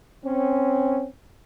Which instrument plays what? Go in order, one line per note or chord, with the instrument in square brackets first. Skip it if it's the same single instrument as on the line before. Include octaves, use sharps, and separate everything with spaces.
[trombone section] C4 C#4